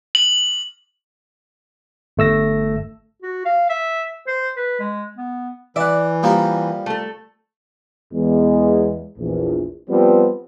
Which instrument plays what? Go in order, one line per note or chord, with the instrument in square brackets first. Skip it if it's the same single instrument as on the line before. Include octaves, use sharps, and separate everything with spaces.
[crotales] F#7
[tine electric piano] G1 A3 E6 A#6
[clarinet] F#4
F5
E5
C5
B4
G#3
B3
[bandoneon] E3 [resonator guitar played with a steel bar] D5 [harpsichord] E5 F#5
[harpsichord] F3 G3 A#3
[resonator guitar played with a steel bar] A3 A4
[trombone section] E2 G#3
A#1 E2
F3 G3 B3 C4